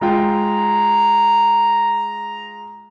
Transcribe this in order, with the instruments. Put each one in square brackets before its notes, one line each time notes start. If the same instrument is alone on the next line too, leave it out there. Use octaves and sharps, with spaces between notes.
[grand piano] G#3 F4 G5 [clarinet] A#5